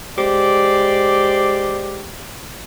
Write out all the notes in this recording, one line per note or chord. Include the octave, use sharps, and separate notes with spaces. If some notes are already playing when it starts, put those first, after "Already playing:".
G#3 G4 C5 D5